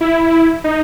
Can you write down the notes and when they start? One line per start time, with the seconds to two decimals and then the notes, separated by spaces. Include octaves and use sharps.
0.01 E4
0.64 D#4